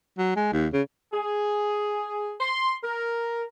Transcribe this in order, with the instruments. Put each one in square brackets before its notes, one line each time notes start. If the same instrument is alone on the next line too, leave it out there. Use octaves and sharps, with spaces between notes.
[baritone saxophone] F#3
G#3
D#2
C#3
[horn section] G#4
C6
A#4